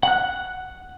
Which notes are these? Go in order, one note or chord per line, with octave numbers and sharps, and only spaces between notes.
F#5 F#6